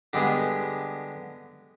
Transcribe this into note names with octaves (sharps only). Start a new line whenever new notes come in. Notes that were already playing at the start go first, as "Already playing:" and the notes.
D3 G3 G#3 B3